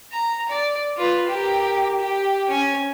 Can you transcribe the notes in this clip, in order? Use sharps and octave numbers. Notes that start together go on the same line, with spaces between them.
A#5
D5
F4 B4
G4 A#4
G4
C#4 G#5